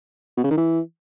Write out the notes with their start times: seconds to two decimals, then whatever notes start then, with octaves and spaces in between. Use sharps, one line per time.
0.37 B2
0.44 C#3
0.51 D#3
0.57 E3